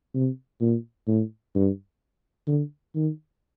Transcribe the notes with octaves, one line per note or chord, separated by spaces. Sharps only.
C3
A#2
A2
G2
D3
D#3